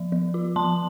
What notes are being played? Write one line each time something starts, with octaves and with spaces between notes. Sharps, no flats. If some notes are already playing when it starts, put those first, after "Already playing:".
Already playing: F3
F3
F4
F3 A5 C6